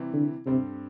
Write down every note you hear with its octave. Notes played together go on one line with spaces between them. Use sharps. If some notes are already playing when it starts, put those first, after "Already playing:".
Already playing: C3 E3 G3 C4 E4
D3
G2 C3 G3 C4 A4